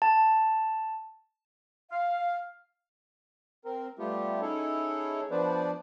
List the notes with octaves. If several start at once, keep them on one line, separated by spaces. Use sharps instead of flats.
A5
F5
C4 A#4
G3 A3 B3 F4 G4
C#4 D#4 E4 G#4 A4 C#5
F3 B3 D4 B4 C5 D5